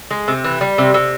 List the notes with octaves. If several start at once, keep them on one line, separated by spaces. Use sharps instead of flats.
G#3
C3
E3
G3
C3
C3